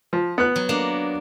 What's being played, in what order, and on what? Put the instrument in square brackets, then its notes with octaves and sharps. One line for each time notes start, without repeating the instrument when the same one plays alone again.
[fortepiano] F3
B3 F#6
[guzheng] F#3
A#3 D4